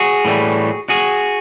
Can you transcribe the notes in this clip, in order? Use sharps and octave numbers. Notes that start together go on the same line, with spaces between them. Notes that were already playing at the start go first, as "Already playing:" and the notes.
Already playing: F#4 G#4
A2 E3 G3
F#4 G#4